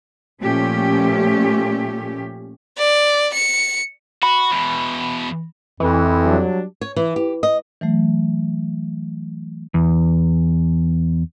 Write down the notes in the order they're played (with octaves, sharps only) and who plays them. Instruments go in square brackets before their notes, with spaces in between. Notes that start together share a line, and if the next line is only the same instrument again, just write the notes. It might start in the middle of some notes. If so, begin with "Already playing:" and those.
[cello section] A#2 F3 A3 C#4 G4
[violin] D5
C#7
[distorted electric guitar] F#4 [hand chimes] B5
[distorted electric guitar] E2 B2
[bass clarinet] F2 [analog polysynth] E3
[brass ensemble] F#3 G3 D4
[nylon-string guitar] C#5
E3
G4
D#5
[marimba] E3 F#3 A3
[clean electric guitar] E2